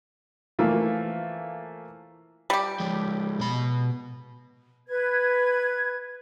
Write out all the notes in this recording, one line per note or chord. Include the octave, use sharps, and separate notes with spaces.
E3 F3 A3 A#3 F4
G3 G4
F3 G#3
B2 B5
B4 G#6